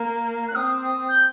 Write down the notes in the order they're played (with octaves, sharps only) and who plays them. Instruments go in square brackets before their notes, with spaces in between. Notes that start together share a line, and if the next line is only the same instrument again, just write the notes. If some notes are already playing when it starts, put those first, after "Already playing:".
Already playing: [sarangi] A#3
[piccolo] F#6
[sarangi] C4 [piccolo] D#6
[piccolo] D#6
G6